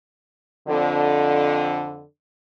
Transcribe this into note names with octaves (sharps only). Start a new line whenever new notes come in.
F2 D3